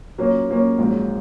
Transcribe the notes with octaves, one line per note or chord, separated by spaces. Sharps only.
A#2 F#3 A#3 C#4
A#2 F#3 A#3 C#4
A#1 G#2 F#3